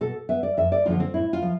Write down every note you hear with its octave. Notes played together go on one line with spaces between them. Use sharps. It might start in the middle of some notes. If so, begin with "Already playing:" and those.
B2 A4
B3 E5
D5
F2 E5
D5
D3 F3 B3 F4
C4
A2 E4
F4
F3